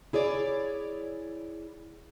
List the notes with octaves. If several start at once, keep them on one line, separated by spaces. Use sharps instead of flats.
E4 G#4 C#5 D5